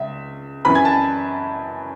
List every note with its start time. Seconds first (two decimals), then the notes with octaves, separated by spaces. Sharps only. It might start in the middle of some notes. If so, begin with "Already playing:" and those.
Already playing: C#2 E5
0.65 F#2 E3 B4 B5
0.75 G#5 G#6
0.85 A5 A6